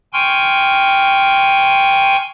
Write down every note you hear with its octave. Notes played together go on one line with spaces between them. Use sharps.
G5 G#5 C6 C#6 F6